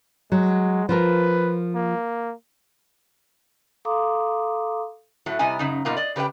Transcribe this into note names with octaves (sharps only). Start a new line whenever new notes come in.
F#3 G#3
F3 F4 A#4 B4
A#3
A4 F5 A#5 C6 D6 D#6
A2 F#3 A3
C3 G3 E4 D#5 G#5
F#2 C#3 D#4
F#2 B2 A#3 D#4 F4
D5 D#5
C#3 G4 B4 D#5 G5